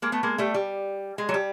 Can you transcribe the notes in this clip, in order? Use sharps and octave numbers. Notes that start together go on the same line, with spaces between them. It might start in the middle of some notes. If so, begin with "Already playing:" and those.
G#3 A#3
A3 B3
G#3 A#3
G3 A3
G3
G#3
F#3
G3